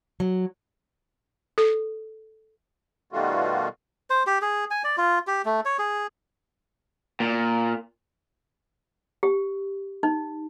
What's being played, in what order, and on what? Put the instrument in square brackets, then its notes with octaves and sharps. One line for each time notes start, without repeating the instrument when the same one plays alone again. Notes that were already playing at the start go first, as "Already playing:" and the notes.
[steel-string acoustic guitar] F#3
[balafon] A4
[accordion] B2 D#3 G3 A3 F4 F#4
[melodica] C5
G4
G#4
G#5
D5
F4
G4
A3
C#5
G#4
[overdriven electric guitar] A#2
[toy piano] G4
D#4